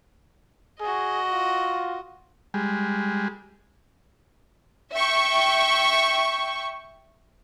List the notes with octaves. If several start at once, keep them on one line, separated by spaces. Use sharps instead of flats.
F#4 G#4 D#5
F4
G3 G#3
E5 G5 C#6